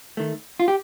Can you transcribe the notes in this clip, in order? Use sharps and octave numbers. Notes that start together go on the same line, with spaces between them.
D#3 A3
F4
G4